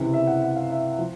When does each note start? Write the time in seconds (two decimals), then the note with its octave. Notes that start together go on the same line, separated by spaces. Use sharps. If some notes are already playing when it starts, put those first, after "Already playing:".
Already playing: C#2 C3 E3
0.13 E5
0.27 F#5
0.42 F#5
0.56 F5
0.70 E5
0.98 F3